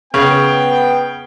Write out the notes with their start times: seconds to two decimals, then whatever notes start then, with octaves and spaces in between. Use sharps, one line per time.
0.14 C#3 B3 G5